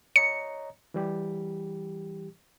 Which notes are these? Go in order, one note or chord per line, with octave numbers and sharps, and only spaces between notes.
C#5 D#5 A#5 C#7
E3 G3 G4